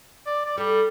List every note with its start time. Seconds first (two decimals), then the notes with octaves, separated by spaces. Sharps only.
0.26 D5
0.45 D5
0.57 G3 A4 A#4